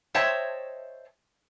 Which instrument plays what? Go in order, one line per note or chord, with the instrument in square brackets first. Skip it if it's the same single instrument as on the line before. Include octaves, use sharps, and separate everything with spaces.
[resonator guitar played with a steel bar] C5 C#5 D#5 E5 G5 A5